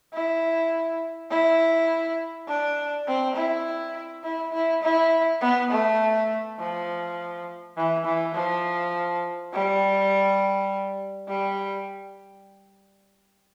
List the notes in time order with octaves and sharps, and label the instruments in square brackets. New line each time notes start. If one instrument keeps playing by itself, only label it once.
[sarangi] E4
E4
D4
C4
E4
E4
E4
E4
B3
A3
F3
E3
E3
F3
G3
G3